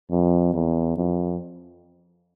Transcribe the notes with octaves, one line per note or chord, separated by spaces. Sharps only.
F2
E2
F2